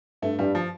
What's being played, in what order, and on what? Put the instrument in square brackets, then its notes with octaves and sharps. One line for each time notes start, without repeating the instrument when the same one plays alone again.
[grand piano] G2 [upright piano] A3
[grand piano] G2 [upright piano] G3
[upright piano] F3